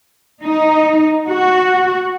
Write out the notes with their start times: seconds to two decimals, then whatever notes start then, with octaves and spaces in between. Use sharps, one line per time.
0.44 D#4
1.29 F#4